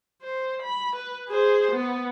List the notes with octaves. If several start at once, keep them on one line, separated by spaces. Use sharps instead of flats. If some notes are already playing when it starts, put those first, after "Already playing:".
C5
B5
B4
G#4 C5
B3